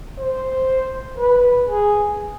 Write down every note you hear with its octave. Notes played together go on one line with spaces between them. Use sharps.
C5
B4
G#4